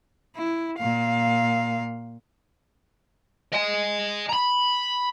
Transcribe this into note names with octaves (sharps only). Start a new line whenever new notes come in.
E4
A#2 F5
D#5 G#5
A#5 B5